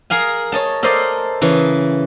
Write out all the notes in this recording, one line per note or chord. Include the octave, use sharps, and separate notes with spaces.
G#4 A#4 F5 G#5
C#5 D#5 A5
A4 A#4 C5 D5 D#5 F5
C#3 E3